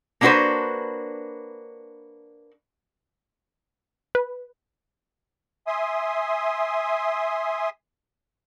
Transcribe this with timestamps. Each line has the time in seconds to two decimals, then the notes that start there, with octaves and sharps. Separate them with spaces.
0.21 A#3 B3 D4 F#4 B4 C5
4.15 B4
5.67 E5 G#5 C6 D#6